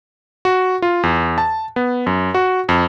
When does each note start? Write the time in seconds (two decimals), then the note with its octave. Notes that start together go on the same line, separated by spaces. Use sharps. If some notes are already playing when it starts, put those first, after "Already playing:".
0.45 F#4
0.82 F4
1.03 E2
1.38 A5
1.76 B3
2.07 F#2
2.34 F#4
2.69 F2